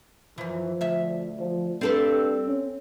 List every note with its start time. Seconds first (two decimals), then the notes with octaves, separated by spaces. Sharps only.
0.38 F#2 E3 F3
0.81 D2 E5
1.39 F3
1.81 G2 C4 A4 B4
2.47 C#4